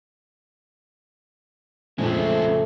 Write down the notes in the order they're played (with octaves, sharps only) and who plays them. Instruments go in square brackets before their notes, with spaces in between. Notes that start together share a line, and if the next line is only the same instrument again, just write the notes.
[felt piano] A#1 F2 [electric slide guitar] C#3 [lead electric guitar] G#3 C4 [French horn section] A3 A4